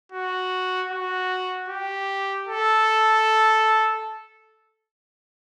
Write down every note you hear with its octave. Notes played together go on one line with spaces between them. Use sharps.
F#4
F#4
G4
A4